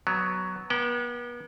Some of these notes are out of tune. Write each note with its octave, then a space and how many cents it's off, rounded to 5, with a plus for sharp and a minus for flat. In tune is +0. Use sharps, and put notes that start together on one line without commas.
F#3 +5 B3 +0
B3 -40 G5 -25